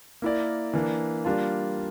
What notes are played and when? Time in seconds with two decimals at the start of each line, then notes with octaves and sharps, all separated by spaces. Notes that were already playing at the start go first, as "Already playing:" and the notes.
0.22 A#3 E4 A#4 D5
0.73 E3 A#3 D4
1.25 G3 A#3 D4 F4